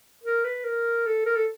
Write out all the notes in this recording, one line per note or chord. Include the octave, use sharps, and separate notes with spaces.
A#4
B4
A#4
A4
A#4
A4